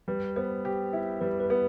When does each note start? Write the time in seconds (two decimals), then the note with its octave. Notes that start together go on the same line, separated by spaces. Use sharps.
0.08 G3 B4
0.36 B3 C5
0.65 G4
0.93 E4
1.21 G3 B4
1.40 B4
1.50 B3